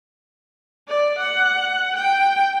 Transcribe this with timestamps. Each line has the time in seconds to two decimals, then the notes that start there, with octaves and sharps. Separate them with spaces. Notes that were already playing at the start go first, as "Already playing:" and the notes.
0.88 D5
1.18 F#5
1.96 G5